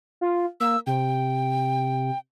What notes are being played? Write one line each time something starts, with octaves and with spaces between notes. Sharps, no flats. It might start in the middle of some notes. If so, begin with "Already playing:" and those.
F4
A#3 E6
C3 G5